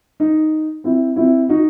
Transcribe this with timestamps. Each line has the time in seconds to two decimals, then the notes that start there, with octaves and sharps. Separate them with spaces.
0.20 D#4
0.84 C4 E4
1.16 C4 E4
1.49 D#4 F#4